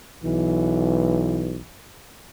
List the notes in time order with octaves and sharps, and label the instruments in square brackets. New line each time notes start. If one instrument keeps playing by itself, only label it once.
[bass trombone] B1 [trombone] E3